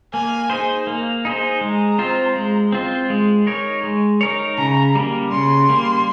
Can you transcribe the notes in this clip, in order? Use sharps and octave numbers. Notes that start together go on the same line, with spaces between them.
A#3 G#5
D#4 G#4 C5
A#3
D#4 G#4 C5
G#3 A#5
C4 F4 C5
G#3
C4 F4 C5
G#3
D#4 A#4 C#5
G#3
D#4 A#4 C#5
C#3 A#5
G3 A#3
C#3 C6
G3 A#3